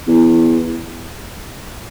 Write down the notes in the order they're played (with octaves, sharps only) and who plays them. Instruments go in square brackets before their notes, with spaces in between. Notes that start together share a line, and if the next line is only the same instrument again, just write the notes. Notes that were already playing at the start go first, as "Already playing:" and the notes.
[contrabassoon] E2